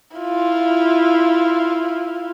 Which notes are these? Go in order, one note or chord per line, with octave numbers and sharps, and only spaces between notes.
E4 F4